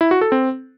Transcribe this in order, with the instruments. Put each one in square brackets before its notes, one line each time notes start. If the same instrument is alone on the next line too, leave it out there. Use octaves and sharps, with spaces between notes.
[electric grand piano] E4
F#4
A4
C4